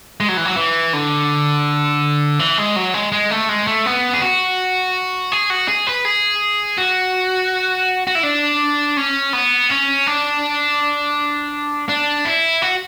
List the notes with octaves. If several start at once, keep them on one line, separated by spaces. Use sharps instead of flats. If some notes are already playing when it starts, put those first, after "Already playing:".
G#3
F#3
E3
F#3
E3
D3
E3
G#3
F#3
G#3
G#3
A3
G#3
A3
B3
G#4
F#4
G#4
F#4
G#4
B4
G#4
F#4
F#4
E4
D4
C#4
B3
C#4
D4
D4
E4
F#4